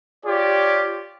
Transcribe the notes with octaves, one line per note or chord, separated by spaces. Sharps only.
F4 G4 C#5 D5